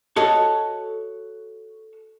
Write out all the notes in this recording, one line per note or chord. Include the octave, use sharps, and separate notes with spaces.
F#4 A4 C#5 D#5 A5